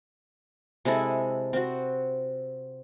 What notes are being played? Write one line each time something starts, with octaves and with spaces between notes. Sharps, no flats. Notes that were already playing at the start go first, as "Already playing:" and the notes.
C3 G#3 E4 A4
C4 F#4